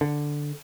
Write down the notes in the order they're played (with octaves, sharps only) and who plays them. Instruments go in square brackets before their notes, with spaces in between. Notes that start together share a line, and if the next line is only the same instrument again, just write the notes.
[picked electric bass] D3